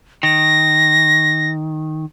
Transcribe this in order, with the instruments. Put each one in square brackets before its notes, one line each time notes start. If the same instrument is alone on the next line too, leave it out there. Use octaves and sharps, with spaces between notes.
[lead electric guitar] D#3 [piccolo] A#6